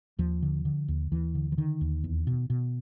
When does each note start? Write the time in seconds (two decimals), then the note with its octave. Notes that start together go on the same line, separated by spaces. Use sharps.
0.19 D#2 F3
0.43 D3
0.65 D3
0.88 D#2
1.12 D#2 E3
1.35 D3
1.52 E3
1.57 D3 D#3
1.81 D#2
2.04 E2
2.27 B2
2.50 B2